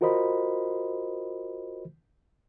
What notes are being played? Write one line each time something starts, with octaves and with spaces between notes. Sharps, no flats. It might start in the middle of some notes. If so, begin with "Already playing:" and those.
F4 F#4 A#4 C5 D#5 B5